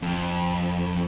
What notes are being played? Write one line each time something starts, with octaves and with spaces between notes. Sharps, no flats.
F2